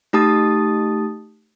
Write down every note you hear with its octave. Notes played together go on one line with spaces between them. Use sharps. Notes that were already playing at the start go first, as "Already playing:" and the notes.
A3 D#4 G4 A5 D#6 A6